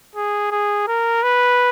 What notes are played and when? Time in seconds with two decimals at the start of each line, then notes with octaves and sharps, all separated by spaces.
0.16 G#4
0.51 G#4
0.87 A#4
1.23 B4